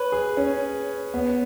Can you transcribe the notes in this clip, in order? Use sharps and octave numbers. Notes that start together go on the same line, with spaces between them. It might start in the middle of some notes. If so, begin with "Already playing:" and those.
Already playing: B4 C#5
G#4
C#4
B3